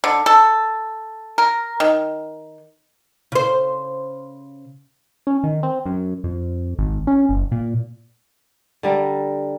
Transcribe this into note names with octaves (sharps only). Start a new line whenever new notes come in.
D3
A4
A#4
D#3
C#3 C5
C#4
D#3
C4
F#2
F2
G#1
C#4
F#1
A#2
D3 G3 A#4